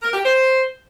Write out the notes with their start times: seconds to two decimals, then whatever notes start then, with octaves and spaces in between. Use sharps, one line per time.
0.02 A#4
0.13 G4
0.24 C5